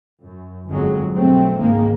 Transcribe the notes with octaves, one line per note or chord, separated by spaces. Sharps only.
F#2
G1 F2 F#3 G#3
B1 G2 F#3 A3 C4
G#1 C#2 G#2 D#3 G#3 A#3